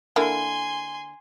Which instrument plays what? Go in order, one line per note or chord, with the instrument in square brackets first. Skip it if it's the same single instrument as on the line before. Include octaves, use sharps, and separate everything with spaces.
[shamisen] D3 A#3 E4 [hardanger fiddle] G#5 C6